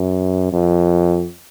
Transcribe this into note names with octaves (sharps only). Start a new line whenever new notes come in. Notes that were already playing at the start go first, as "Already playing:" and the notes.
Already playing: F#2
F2